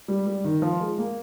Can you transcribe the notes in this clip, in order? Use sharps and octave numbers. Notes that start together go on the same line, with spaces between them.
G3
G3
D#3
F3
G#3
A#3